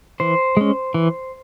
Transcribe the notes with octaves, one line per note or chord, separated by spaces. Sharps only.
E3 C5
G#3 C#4
E3